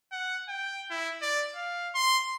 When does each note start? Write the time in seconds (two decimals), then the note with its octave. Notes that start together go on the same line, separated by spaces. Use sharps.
0.12 F#5
0.48 G5
0.90 E4
1.22 D5
1.56 F5
1.95 C6